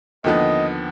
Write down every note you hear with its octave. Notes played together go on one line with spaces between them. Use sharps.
D#2 D3 F3 B3 D#5